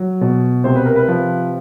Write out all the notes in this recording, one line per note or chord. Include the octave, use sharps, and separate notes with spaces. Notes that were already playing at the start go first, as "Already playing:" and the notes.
Already playing: F#3
B2
C3 C5
B4
A#4
B4
F3